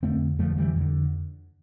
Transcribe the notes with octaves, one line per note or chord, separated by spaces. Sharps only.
F2 D3 A3 C4
F2 D3 F3 A3
E3 G3
F2 D3